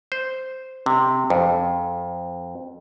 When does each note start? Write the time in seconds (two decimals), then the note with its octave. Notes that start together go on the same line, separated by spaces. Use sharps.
0.12 C5
0.86 C3
1.30 F2